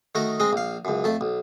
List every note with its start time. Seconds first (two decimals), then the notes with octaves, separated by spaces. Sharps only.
0.15 D#3 A3 D#4 F#4 A#4
0.40 G#3 C4 D#5
0.53 A#1 F5
0.85 C#2 F#2
1.04 F2 A3 A5
1.21 B1